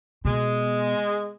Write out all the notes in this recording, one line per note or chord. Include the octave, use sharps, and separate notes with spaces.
B2 G#3